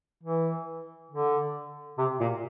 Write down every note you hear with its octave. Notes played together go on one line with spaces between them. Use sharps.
E3
D3
C3
A#2